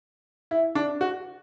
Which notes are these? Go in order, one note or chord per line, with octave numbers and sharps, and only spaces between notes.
E4
D4
F#4